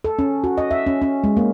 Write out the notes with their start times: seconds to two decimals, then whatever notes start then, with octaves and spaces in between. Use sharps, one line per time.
0.04 A4
0.19 C#4
0.44 F#4
0.58 D#5
0.71 E5
0.86 C#4
1.02 C#4
1.24 G#3
1.37 A#3